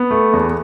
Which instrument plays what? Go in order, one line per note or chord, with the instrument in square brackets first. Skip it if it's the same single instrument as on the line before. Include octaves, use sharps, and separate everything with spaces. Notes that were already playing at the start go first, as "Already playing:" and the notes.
Already playing: [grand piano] B3
A3
E2